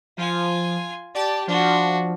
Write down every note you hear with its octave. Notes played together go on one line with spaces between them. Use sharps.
F3 F4 G#5
G4 D5 A5
F3 D4 F#4